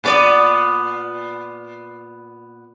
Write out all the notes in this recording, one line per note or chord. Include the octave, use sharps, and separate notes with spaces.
A#2 B3 D5